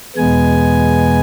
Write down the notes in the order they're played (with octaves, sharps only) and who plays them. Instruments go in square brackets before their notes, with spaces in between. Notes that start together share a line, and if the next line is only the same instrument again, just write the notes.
[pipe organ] E2 B2 G#3 B3 G#5